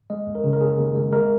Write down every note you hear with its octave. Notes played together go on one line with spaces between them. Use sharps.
G#3 D#5
D#2
A#4
C#3
A#4
D#2 G#4
D#2
G#3
G#3 A#4